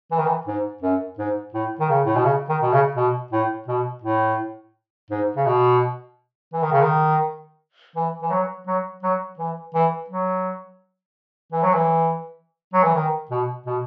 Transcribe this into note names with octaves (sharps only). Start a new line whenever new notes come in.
E3
D#3
E3
G#2
F#2
G#2
A2
D#3
C#3
A2
B2
C#3
D#3
B2
C#3
B2
A2
B2
A2
G#2
C#3
B2
E3
D#3
C#3
D#3
E3
E3
F#3
F#3
F#3
E3
E3
F#3
E3
F#3
E3
F#3
E3
D#3
B2
B2